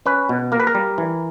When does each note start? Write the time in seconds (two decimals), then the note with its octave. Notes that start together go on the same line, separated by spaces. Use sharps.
0.06 C#4 B4
0.29 B2
0.52 A#3 A#4
0.60 B4
0.67 A#4
0.75 G3
0.98 E3